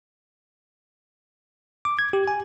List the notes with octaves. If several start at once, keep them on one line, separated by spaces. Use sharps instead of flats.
D6
G#6
G4
G#5